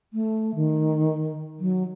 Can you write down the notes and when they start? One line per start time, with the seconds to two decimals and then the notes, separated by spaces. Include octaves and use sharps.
0.13 A3
0.55 D#3
1.60 F#3